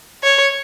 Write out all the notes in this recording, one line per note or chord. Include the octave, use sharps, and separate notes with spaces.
C#5